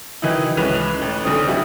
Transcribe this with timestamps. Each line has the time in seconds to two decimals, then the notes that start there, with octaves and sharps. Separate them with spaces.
0.22 D#3 E3 F#3 D#4 E4
0.57 C#2 E3 C#4 B4 F#6 F7
1.01 A1
1.24 B1 D3 C4 D#6
1.47 G3 D#4 E4 F#4 G4